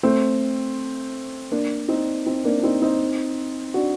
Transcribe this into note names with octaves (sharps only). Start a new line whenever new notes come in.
A3 C4
A#3 D4
C4 D#4
C4 D#4
A#3 D4
D4
C4 D#4
C4 D#4
D4 F#4